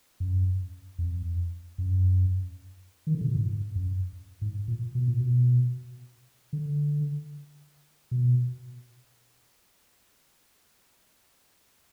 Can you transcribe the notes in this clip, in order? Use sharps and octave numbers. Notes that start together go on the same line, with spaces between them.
F#2
F2
F#2
D#3
D3
B2
A#2
G#2
F#2
G#2
A#2
B2
A#2
B2
D3
B2